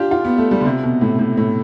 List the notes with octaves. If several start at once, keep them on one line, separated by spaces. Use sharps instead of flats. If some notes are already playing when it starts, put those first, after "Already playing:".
Already playing: D4 F4 G4
F4
B3
A3
G3
D3
C3
B2
A2
A2
A2